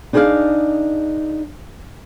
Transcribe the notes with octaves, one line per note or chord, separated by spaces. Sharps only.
D4 D#4 G#4 C5 D5 F5